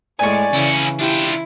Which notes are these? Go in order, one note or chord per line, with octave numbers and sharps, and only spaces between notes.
A2 G#3 D5 G#5 C#6
C#3 E3 C#4 E4
D4 E4 F4 G4